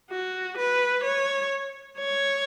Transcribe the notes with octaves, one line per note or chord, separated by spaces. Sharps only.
F#4
B4
C#5
C#5